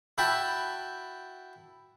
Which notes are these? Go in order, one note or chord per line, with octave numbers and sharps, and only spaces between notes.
E4 F#4 G5 A5 B5